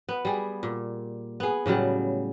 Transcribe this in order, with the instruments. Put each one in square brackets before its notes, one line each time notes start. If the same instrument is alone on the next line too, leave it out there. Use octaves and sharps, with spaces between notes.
[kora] B3
G3 G#4
A#2
B3 G#4
A2 C#3 F#3 G3